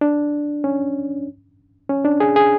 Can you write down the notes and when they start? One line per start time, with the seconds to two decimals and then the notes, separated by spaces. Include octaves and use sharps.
0.01 D4
0.64 C#4
1.90 C#4
2.05 D4
2.20 G#4
2.36 G#4